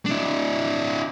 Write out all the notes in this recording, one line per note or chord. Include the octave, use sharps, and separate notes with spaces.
D4 E4